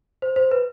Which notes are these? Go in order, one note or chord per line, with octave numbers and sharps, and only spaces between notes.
C5
C5
B4